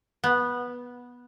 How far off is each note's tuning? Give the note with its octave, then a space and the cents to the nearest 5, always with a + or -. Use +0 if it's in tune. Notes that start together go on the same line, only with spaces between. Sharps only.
B3 -10